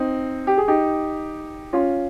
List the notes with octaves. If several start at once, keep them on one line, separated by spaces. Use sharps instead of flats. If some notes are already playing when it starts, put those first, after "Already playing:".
Already playing: C4 D#4
G4
G#4
D#4 G4
C#4 F4